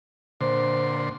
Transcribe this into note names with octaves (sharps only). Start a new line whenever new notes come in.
A#2 D3 C5 C6